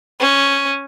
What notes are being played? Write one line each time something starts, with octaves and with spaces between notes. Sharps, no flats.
C#4